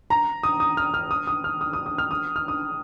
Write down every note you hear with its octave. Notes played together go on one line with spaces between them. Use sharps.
A#5
D#6
D#6
F6
F6
D#6
D#6
F6
D#6
D#6
D#6
F6
D#6
F6
D#6